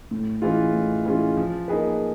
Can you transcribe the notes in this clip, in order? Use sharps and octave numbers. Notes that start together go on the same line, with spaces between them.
A2
E3 G#3 C#4 F4
A2
E3 G#3 C#4 F4
F3
A#3 D#4 G#4 B4